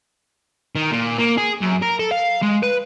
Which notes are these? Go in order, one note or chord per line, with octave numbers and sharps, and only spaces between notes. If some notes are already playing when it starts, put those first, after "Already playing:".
D#3
A#2
A#3
G#4
F#2
A#4
A4
F5
G#3
B4